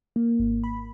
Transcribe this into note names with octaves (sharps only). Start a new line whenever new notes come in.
A#3
G#1
B5